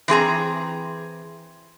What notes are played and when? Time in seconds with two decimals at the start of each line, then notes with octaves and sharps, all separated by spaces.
0.08 E3 C4 G#4 A#5